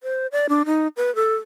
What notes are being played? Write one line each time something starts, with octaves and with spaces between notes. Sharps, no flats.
C5
D5
D4
D#4
B4
A4